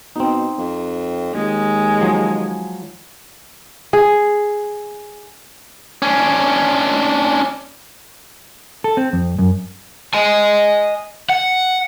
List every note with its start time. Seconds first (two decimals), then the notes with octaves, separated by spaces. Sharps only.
0.16 B2 C4 D#4
0.59 F2
1.34 D#2 G#3
2.01 F3 F#3
3.93 G#4
6.02 C#4 D4
8.84 A4
8.97 C4
9.13 F2
9.38 F#2
10.14 D#5 G#5
11.29 F#5